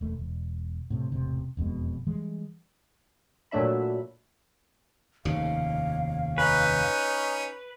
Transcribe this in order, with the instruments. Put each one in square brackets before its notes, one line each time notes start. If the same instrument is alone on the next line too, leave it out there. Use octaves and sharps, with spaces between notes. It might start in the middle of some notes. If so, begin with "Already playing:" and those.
[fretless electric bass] E1 A3
E1
A2 C3
E1 A1 C3
E1 F2 B2 G#3
E3 G3 G#3
[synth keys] A#2 F#3 A3 D4 E5 B5
[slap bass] F1 D#2 C#3 [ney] F5
[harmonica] C#4 D#4 [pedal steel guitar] B4